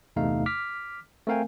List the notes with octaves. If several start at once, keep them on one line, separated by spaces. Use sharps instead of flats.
G1 E2 C3 A3 D#4 F5
D6 F6 B6
A3 C4 A#4 F5 G5 G#5